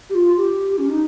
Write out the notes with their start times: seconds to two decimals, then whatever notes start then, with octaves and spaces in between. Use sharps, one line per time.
0.09 G4
0.15 F4
0.37 G4
0.78 C#4
0.89 D#4